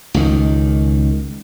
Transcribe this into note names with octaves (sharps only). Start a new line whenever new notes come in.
C#2 D#3